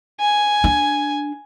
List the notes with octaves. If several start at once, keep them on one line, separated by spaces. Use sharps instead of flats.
G#5
D4